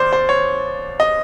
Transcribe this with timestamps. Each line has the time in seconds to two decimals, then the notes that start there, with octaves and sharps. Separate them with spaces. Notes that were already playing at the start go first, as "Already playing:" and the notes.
Already playing: D#2 C5 D5
0.13 C5
0.29 C#5
1.00 D#5